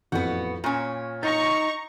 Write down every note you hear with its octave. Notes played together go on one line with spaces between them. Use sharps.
A1 F2 B3 F#4 G6
A#2 C#4 C#6
D#4 A#5 C#6 A6 A#6